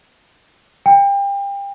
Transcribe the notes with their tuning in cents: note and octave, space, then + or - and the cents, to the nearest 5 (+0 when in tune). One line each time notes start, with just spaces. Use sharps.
G5 +30